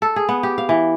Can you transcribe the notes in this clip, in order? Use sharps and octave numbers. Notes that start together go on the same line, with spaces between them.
A4
G#4
B3
G4
F5
E3